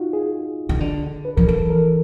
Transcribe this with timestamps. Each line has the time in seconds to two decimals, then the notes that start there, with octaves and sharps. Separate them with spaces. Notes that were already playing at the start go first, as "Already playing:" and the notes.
Already playing: D#4 F4 F#4
0.13 G#4
0.69 D#3
0.80 D3
1.25 B4
1.37 F3 A#4
1.48 E3 A4
1.70 A#4